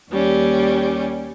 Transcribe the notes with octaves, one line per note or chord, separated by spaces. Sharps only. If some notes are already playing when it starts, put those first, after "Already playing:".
D#2 G3 C#4 G4